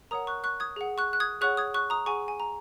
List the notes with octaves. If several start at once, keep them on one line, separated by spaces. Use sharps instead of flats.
A#4 C#5 F#5 A#5 D#6
C#6 F#6
C#6 F#6
D#6 G#6
G#4 F#5
C#6 F#6
F#6
D#6 G#6
G#4 C#5 F#5 C#6 F#6
D#6 G#6
C#6 F#6
A#5 D#6
G#4 F#5 G#5 C#6
G#5
A#5